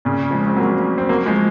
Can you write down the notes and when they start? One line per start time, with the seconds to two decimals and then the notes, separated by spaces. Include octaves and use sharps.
0.05 A#2 C#3
0.31 F3 G#3
0.47 C4
0.57 F#3 A#3
0.98 C4
1.09 F#3 A#3
1.26 F3 G#3